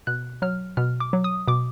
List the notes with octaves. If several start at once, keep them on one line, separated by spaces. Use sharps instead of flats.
B2 F#6
F#3 F6
B2 F6
D6
F#3
D#6
B2 D6